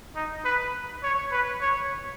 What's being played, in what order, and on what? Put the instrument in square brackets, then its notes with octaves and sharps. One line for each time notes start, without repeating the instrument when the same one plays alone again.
[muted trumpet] D#4
B4
C#5
B4
C#5